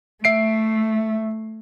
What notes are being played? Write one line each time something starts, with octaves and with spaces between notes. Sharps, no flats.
A3 E5 C7 D7